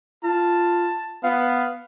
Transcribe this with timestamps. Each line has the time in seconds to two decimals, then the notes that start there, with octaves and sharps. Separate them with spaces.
0.24 F4 A5
1.23 B3 F5